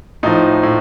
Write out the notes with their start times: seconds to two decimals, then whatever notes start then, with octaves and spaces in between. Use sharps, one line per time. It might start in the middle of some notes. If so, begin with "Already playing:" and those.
0.23 A2 F3 D#4
0.63 A2